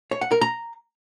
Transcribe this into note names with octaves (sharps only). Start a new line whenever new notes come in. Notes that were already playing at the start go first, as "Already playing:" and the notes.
C#5
F#5
A#4
A#5